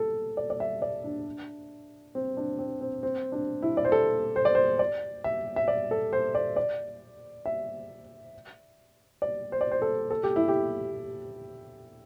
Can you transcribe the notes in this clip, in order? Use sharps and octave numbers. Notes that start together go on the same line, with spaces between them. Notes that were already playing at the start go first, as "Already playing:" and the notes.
Already playing: A4
D5
D5
E5
D5
D4
C4
D4
C4
C4
C4
D4
E4
D5
C5
A4
C5
D5
C5
D5
E5
E5
D5
A4
C5
D5
D5
E5
D5
C5
D5
C5
A4
A4
G4
E4
G4